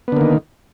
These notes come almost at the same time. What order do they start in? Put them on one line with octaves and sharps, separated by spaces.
B3 D3 A#3 D#3